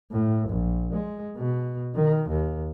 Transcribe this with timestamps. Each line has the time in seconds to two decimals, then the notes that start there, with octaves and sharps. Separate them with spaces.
0.11 A2
0.49 A#1
0.93 G#3
1.37 B2
1.95 D#3
2.29 D#2